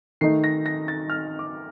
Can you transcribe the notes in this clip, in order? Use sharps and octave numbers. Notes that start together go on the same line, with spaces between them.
D#3 A3 D#4 C7
A#6
A#6
A6
F6
D6